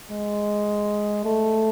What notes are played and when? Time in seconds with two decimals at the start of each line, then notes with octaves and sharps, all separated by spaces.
0.11 G#3
1.25 A3